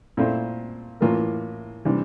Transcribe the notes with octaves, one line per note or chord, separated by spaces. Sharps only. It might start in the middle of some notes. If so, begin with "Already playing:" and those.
A#2 A3 C4 E4
A2 E3 A#3 F4 A#4
C3 E3 G3 D4